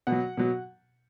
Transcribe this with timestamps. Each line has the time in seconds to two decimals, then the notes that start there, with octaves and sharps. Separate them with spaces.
0.07 B2 F#5
0.12 F#3
0.37 B2 F#3